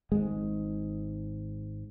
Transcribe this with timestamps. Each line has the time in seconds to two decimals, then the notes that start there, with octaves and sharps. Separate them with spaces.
0.12 G#1 G#2 G#3